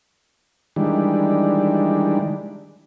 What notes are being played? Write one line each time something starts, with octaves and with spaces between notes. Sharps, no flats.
D#3 E3 G3 G#3 D4